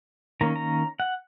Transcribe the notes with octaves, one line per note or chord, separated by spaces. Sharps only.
D#3 A#3 C#4 A#5
A#5
F#5